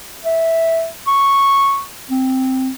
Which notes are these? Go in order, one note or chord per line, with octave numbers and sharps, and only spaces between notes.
E5
C#6
C4